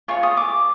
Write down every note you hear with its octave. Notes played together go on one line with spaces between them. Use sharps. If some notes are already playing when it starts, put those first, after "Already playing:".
F4 G#4 C#5 C#6
D#6
D6